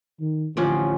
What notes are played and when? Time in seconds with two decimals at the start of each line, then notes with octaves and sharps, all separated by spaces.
0.20 D#3
0.57 A1 D3 F3 C#4